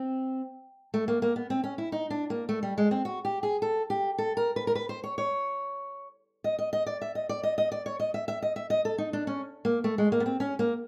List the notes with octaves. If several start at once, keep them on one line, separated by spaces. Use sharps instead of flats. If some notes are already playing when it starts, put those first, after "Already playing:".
Already playing: C4
A3
A#3
A#3
B3
C4
C#4
E4
D#4
D4
A#3
A3
G3
G#3
C4
F#4
G4
G#4
A4
G4
A4
A#4
B4
A#4
B4
C5
C#5
C#5
D#5
D#5
D#5
D5
E5
D#5
D5
D#5
D#5
D5
C#5
D#5
E5
E5
D#5
E5
D#5
A4
D#4
D4
C#4
A#3
A3
G#3
A#3
B3
C4
C#4
A#3